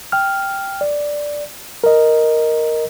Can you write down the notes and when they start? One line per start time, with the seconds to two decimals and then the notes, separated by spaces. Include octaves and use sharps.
0.12 G5 F6
0.81 D5
1.84 A#4 D#5